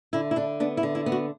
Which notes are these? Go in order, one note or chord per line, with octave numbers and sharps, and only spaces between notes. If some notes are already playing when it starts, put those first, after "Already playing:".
D3 E4
E4
D3 D4
B3 D4
E4
D3
E4
B3
F#4